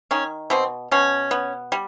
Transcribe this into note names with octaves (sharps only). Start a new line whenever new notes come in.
D#3 C#4
B2 C4
B2 C#4
B3
G3